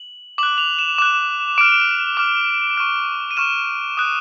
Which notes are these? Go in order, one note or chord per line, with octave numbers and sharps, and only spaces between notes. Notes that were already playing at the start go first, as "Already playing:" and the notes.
Already playing: F#7
D6 F#6 F#7
F7
E7
D6 F#6 E7
D6 F6 D7
D6 F6
C#6 F6
D#7
C#6 F6 E7
D#6 F#6